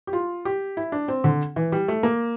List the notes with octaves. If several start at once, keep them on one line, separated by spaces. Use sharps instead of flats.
G4
F4
G4
E4
D4
C4
D3
E3
G3
A3
A#3